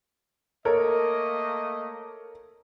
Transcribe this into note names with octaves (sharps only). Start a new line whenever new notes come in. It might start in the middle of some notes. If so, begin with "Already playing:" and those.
A3 A#3 A4 A#4 C#5 D#5